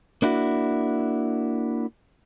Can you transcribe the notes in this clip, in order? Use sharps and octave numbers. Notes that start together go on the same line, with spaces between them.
A#3 D4 E4 F#4